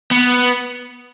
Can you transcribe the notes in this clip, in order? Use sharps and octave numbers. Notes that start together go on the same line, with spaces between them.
B3